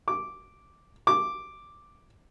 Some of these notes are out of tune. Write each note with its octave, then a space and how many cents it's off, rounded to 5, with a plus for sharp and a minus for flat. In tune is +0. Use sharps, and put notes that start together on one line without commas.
D6 -5
D6 +0